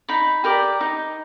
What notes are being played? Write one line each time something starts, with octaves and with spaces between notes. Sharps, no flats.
D#4 B5
G4 A#4 D5
D#4